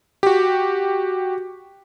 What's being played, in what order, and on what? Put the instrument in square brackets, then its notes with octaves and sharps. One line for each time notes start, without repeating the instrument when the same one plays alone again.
[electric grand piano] F#4 G4